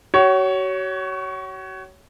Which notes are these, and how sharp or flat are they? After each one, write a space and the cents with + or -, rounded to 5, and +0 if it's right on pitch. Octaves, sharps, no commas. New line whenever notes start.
F#4 +40 C#5 +10